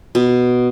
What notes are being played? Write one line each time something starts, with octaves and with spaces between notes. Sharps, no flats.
B2